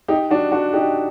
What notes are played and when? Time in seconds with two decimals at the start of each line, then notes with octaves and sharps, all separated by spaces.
0.08 D#4 G4
0.31 D4 F#4
0.52 D4 F#4
0.73 D#4 G4